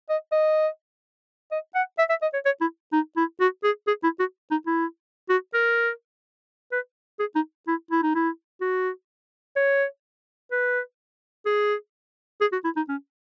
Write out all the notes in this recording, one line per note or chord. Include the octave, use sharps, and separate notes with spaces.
D#5
D#5
D#5
F#5
E5
E5
D#5
C#5
C#5
E4
D#4
E4
F#4
G#4
G#4
E4
F#4
D#4
E4
F#4
A#4
B4
G#4
D#4
E4
E4
D#4
E4
F#4
C#5
B4
G#4
G#4
F#4
E4
D#4
C#4